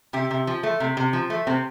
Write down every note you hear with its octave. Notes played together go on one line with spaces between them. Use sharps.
C3 G4
C3
F3
A3
C3
C3
F3
A3
C3 C4